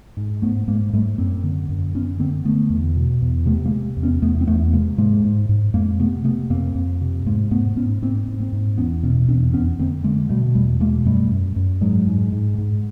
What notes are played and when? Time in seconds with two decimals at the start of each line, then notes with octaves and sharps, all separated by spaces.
0.17 G#2
0.42 G#2 A3 B3
0.68 G#2 G#3 A#3
0.93 G#2 G3 A3
1.18 F#2 A#3 C4
1.44 D3
1.69 F#2
1.95 D3 B3 C#4
2.19 D3 A#3 C4
2.45 D3 A3 B3
2.70 E2
2.95 B2
3.22 E2
3.46 C3 A3 B3
3.65 G#3 A#3
3.72 C3
3.97 E2
4.03 B3 C#4
4.22 E2 A3 B3
4.41 C4
4.47 E2 A3 B3
4.73 C3 G#3 A#3
4.98 G#2 G#3 A#3
5.24 G#2
5.49 G#2
5.74 F2 G#3 A#3
5.99 C3 A3 B3
6.24 C3 A3 B3
6.50 F2 A#3 C4
6.75 F2
7.01 C3
7.26 G#2 G#3 A#3
7.51 G#2 A3 B3
7.77 G#2 B3 C#4
8.02 G#2 A#3 C4
8.27 G#2
8.40 A#3 C4
8.53 G#2
8.77 E2 B3 C#4
9.03 B2 B3 C#4
9.28 E2 C4 D4
9.54 F2 B3 C#4
9.79 D3 A#3 C4
10.04 D3 G#3 A#3
10.29 B2 G3 A3
10.55 E2 G3 A3
10.80 B2 G#3 A#3
11.05 F#2 G3 A3
11.31 F#2
11.56 F#2
11.81 G#2 F#3 G#3
12.07 G#2
12.32 G#2
12.58 G#2